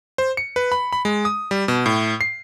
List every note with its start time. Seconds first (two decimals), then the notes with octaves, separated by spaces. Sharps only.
0.18 C5
0.37 C#7
0.56 B4
0.72 B5
0.93 B5
1.05 G#3
1.25 D#6
1.51 G3
1.68 B2
1.86 A2
2.21 C7